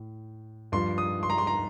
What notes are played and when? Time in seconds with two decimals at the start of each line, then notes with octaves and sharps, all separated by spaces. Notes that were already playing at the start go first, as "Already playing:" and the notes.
Already playing: A2
0.72 G2 F3 C6
0.98 D#6
1.23 C6
1.30 A#5
1.38 C6
1.47 A#5